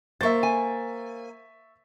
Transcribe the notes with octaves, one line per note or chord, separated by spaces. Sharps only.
A#3 C5 E5 C#6 A6
G#5